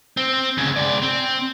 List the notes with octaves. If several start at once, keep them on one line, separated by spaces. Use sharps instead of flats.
C4
D2 C#3
G#3 D5
C4